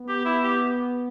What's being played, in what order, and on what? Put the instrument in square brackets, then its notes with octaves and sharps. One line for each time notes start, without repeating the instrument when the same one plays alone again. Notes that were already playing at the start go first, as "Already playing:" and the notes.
Already playing: [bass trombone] B3
[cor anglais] G4
E4
G4